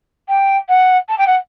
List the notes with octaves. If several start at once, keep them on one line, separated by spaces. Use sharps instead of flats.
G5
F#5
A5
G5
F#5